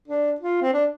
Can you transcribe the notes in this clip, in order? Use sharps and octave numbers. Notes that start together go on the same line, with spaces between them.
D4
F4
C4
D4